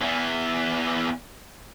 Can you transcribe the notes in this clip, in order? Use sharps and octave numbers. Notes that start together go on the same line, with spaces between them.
E2 E3